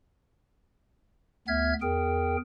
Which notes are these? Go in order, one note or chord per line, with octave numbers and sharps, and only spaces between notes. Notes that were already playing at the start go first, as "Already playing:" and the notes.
D2 B3 E5 F6 G#6
E2 G#4 A#4 G5